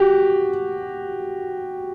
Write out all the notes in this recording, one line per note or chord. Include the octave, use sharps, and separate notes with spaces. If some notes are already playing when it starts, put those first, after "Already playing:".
Already playing: F#4 G4